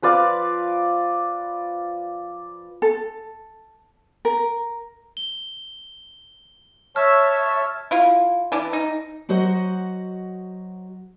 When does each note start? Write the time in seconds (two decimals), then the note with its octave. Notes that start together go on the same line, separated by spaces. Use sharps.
0.02 F3 B4 D5 F5
2.82 A4
4.25 A#4
5.17 G7
6.96 C#5 E5 A5 F6
7.91 E4 F4
8.52 E3 D4
8.73 D#4
9.29 F#3 F#4 C5 D#5 F#5